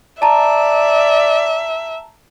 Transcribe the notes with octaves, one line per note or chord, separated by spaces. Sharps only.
D5 E5 A5 A#5